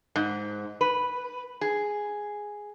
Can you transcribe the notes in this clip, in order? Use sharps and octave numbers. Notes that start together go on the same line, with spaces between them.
G#2
B4
G#4